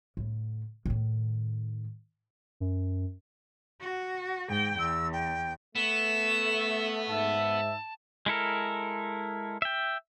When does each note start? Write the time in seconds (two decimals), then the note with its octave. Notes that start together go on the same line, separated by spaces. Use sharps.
0.17 A2 D3
0.86 A2 D#3
2.60 F#2
3.81 F#4
4.49 G#2 G5
4.79 E2 E6
5.13 G5
5.75 A3 B3 E7
7.08 G#2 E5 A5
8.26 G#3 E4 A4 A#4
9.62 E5 G5